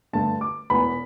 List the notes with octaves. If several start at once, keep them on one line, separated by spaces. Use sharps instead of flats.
G2 D3 A3 A5
D6
E1 E2 E3 B3 B5